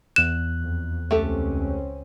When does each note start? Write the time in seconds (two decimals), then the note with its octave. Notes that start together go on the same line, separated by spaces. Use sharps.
0.16 E2 F#6 E7
0.61 F2
1.11 C#2 A3 C4 C#4 G4 A4